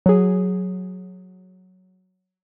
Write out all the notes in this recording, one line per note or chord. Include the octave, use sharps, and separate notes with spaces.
F#3 G#4